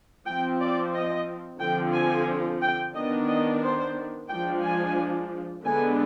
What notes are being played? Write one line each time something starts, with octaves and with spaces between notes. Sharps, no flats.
F3 C4 G5
D5
D#5
D3 F3 C4 G5
G#5
G5
D#3 B3 D4 D#5
D#5
C5
F3 G#3 D4 G5
G#5
D3 G#3 B3 D4 G#5